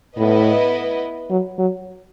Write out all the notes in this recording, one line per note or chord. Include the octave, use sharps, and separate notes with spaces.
A2 B3 E4 B4 D#5
F#3
F#3